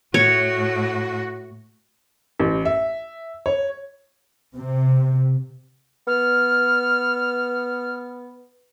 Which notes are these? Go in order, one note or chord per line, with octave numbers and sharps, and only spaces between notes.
A2 F#4 C#5
A1
E5
C#5
C3
B3 F6